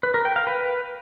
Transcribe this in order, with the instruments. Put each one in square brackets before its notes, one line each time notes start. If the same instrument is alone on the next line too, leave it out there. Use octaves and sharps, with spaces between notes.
[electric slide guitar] B4
A#4
G5
F5
B4